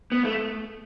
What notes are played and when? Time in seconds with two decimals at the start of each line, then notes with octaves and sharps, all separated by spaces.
0.12 B3
0.25 A3